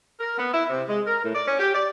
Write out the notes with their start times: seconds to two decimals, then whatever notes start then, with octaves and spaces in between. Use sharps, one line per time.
0.19 A#4
0.37 B3
0.52 E4
0.69 C3
0.88 G#3
1.06 A#4
1.22 A2
1.34 D5
1.47 C#4
1.59 G4
1.74 D5